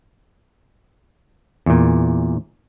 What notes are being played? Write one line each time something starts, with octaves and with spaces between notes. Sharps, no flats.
E2 A#2